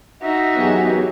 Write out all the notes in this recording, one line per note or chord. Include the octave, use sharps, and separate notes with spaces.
D#4 F#4 E5
F#2 E3 F#3 B3 G4 G#4